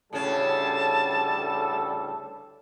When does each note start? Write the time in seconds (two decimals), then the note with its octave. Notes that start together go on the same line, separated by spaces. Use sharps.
0.13 D2 A2 C#3 G3 C#4 A4 A5